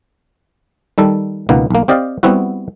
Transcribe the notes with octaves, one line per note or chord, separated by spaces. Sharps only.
D#3 G3 A4
C#2 B2 D#3 A#3 B3
B1 A#3
C4 G4 D5 D#5 F5
G3 B3 C4 E4 F#4